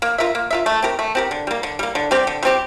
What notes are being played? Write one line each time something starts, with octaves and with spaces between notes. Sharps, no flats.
A#3
F4 A#4 E5
A#3
F4 A#4 E5
A3
C4 G4 A#4
A3
C4 G4 A#4
D3
G3 A#3
D3
G3 A#3
D3
G3 C4 G4
D3
G3 C4 G4